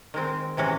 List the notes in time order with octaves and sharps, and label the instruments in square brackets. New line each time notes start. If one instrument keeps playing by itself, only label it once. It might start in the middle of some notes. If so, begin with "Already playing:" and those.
[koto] D#3 G#3 C4
C3 E3 G#3 C#4 F#4